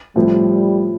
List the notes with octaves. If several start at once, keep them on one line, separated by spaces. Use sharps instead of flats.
A2 F3 G3 C4